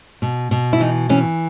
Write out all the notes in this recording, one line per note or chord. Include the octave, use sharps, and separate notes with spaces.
B2
B2
E4
E3 D#4
E3 C#4